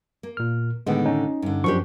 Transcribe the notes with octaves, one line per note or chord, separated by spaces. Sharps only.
A#3
A#2 F6
A2 D3 D#3 G#3 B3
C#4 D#4
G2 D3
F#2 F3 A#3 D4 G4 C#6